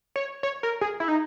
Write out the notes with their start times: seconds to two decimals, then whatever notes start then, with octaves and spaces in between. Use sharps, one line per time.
0.16 C#5
0.43 C#5
0.63 A#4
0.81 G#4
1.00 E4
1.08 D#4